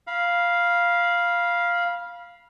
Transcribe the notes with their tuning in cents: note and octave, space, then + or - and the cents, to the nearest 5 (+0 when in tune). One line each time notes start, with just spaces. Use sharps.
F5 +0 B5 -30